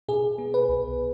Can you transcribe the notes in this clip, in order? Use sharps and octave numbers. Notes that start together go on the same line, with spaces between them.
B2 G#4
B3
B4
C2